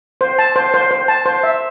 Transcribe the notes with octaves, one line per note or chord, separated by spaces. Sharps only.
C5
A5
C5
C5
C5
A5
C5
E5